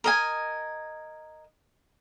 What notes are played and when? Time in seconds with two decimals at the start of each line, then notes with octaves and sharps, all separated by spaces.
0.04 A#4 D#5 G#5